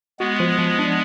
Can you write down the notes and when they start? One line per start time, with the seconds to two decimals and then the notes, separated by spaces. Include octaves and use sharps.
0.20 G#3 B3 F#4
0.40 F3
0.59 F3
0.79 D4